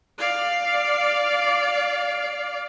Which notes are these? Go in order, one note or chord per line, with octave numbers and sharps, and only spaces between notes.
D5 F5